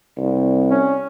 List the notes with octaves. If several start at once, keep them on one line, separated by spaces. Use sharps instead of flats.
C2
C#4